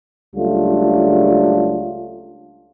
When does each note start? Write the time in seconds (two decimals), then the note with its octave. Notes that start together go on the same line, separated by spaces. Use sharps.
0.35 C#2 F#3 G3 A3 D4 F4